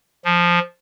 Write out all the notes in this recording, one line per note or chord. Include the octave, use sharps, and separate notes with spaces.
F3